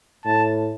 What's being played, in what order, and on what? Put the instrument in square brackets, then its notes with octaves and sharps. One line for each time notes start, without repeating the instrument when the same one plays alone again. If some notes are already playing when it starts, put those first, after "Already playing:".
[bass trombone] A2 [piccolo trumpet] A5